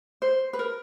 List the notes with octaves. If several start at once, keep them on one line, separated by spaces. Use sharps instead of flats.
C5
B4
A#4